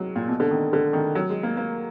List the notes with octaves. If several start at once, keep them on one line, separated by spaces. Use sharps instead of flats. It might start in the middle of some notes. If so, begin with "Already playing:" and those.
Already playing: F#3 G#3
A#2
B2
D3
D#3
D3
D#3
F#3
G#3
A#3
A#3